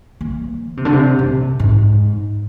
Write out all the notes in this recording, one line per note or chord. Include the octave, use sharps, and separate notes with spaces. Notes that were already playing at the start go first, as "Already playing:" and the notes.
A#3
D3
C3
D3
C3
C3
G#2